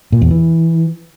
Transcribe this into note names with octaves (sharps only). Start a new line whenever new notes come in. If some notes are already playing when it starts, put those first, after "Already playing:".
A#2
E2
E3